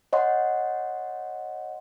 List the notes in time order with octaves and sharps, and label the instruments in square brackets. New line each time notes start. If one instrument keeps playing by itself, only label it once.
[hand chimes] C#5 D#5 F#5 C6